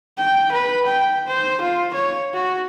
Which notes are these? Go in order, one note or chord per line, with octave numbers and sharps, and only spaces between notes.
G5
B4
G5
C5
F4
C#5
F#4